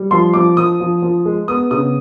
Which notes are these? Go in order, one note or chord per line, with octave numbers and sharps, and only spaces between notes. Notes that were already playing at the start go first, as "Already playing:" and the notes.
Already playing: G3
F3 C6
F3 D6
F3 D#6
F3
F3
G#3
B3 D#6
C#3 D#6